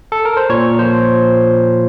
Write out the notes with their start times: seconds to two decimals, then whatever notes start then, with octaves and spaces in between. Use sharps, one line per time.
0.12 A4
0.25 A#4
0.37 C5
0.50 A#2 C#5
0.79 F3 C5